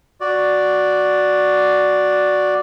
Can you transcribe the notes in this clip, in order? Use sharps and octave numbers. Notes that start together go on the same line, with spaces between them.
F#4 D5